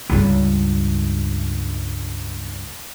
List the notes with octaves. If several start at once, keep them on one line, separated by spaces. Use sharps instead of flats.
C#2 G2